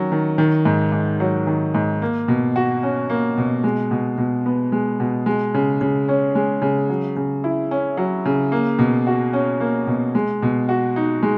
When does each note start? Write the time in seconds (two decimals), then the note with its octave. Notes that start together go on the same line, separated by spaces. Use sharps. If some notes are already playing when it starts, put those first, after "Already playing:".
Already playing: D#3 F#3 C#4
0.12 D#3
0.38 D#3
0.65 G#2
0.92 G#2
1.20 F#3
1.47 D#3
1.74 G#2
2.02 A#3
2.28 B2
2.56 F#4
2.83 C#4
3.10 A#3
3.37 B2
3.64 G#3
3.91 B2
4.18 B2
4.46 B3
4.72 G#3
5.00 B2
5.26 G#3
5.54 C#3
5.81 C#3
6.09 C#4
6.35 G#3
6.62 C#3
6.89 F#3
7.16 C#3
7.44 E4
7.71 C#4
7.97 F#3
8.25 C#3
8.52 A#3
8.79 B2
9.07 F#4
9.33 C#4
9.60 A#3
9.87 B2
10.15 G#3
10.42 B2
10.69 F#4
10.96 D#4
11.23 G#3